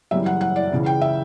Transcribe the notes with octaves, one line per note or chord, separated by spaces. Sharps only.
F#1 F#2 E3 G3 E5
F#5
F#5
D5
C#2 C#3 E3
G5
E5